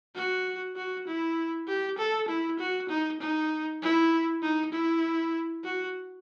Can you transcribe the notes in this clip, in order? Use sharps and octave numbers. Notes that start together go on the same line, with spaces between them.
F#4
F#4
E4
G4
A4
E4
F#4
D#4
D#4
E4
D#4
E4
F#4